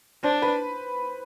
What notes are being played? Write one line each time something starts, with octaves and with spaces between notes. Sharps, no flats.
D4 C5
B4